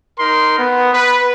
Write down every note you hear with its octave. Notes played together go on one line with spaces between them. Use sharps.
D#4 A#4 C6
B3
B4